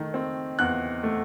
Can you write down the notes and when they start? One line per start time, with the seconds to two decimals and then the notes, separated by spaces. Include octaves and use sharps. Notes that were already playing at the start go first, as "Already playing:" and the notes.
Already playing: D#3 A3
0.14 C4
0.59 E2 F#6
1.03 A3